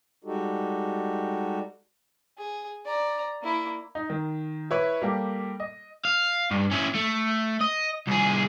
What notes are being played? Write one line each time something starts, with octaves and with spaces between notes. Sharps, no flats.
G3 G#3 D#4 F#4 G4 A4
G#4
D5 A#5
A#3 E4
D#4
D#3
E4 B4 C#5
G3 A#3 G4 A4
D#5
F5
G2
C#4 E4
A3
D#5
C2 G#4